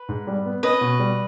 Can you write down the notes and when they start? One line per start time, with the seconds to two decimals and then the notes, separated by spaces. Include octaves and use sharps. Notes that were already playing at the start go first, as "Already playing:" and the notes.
Already playing: B4
0.09 G#2
0.27 G3
0.45 B3
0.63 C#4 B4 D#5
0.81 B2
0.99 G3